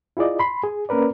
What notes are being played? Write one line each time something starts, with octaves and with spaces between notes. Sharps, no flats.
E4 F4 G#4 D5 D#5
B5 C6
G#4
A#3 C#4 A#4 B4 D5